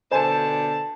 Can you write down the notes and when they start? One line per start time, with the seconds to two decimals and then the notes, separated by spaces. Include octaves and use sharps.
0.11 B2 D3 C5 G#5 A5